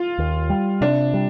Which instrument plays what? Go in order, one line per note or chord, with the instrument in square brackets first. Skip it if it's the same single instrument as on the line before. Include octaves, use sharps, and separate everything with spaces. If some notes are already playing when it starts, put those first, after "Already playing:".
Already playing: [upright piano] F4
[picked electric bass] D#2
G3
[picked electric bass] C3 [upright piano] D4
[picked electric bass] G3